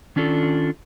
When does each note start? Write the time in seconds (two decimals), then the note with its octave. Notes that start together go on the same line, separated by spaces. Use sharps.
0.16 D#3 C#4 D4 F4 A4